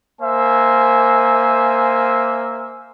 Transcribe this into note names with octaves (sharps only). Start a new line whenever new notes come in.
A#3 C5 E5 G#5